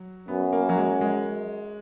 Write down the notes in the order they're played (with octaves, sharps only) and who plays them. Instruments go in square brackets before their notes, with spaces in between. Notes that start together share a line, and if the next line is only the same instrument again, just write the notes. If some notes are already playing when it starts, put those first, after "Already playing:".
Already playing: [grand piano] F#3
[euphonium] F#2 [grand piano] B3
[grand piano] A#3
F#3
G#3
G#3